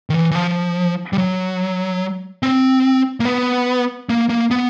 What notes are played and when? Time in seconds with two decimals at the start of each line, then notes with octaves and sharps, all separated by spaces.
0.10 D#3
0.14 E3
0.31 E3
0.35 F3
1.13 G3
1.18 F#3
2.43 C4
3.20 A#3
3.25 B3
4.09 A#3
4.29 A#3
4.51 B3